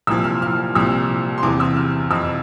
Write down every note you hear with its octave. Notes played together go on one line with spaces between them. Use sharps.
C2 A#2 F3 E6
F6
F6
C2 A#2 F3 E6
C6
E2 C3 E3 D6
E6
F6
F2 C3 F3 E6